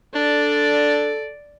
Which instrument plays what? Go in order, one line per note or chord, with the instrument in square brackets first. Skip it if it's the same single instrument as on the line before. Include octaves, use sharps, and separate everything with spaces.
[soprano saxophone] D4 [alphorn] A4 [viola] D5